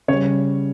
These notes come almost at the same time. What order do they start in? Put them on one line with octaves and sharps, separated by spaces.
C#3 C#5 G3